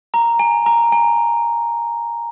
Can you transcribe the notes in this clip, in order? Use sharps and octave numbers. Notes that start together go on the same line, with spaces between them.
A#5
G#5
A#5
G#5